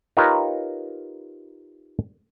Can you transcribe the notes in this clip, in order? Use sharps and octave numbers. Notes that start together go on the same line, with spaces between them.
D#4 F4 G4 A#4 B4 C#5